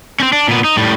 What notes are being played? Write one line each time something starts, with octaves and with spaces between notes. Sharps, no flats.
C4 C#4
D4
A#2 B3
D#4
A2 G3